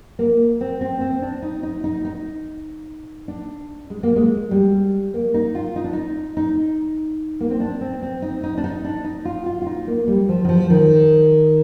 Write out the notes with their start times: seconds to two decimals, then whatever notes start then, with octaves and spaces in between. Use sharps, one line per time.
0.19 A#3
0.61 C4
0.81 C4
1.01 C4
1.22 D4
1.42 D#4
1.63 D#4
1.84 D#4
2.05 D#4
3.28 D4
3.90 G#3
4.03 A#3
4.16 G#3
4.51 G3
5.14 A#3
5.34 D#4
5.55 F4
5.76 D#4
5.84 D4
5.93 D#4
6.37 D#4
7.40 A#3
7.50 C4
7.60 D4
7.81 C4
8.02 C4
8.22 D#4
8.43 D#4
8.57 D4
8.64 D#4
8.85 D4
9.04 D#4
9.25 F4
9.46 F4
9.62 F4
9.66 D#4
9.87 A#3
10.07 G3
10.29 F3
10.44 D#3
10.49 F3
10.70 D#3